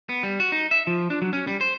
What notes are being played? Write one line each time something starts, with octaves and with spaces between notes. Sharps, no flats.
B3
G3
F#4
D#4
E5
F3
D4
F#3
C#4
G3
C5